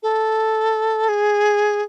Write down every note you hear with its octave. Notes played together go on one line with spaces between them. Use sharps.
A4
G#4